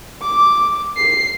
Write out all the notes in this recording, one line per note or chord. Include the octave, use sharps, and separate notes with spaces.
D6
C7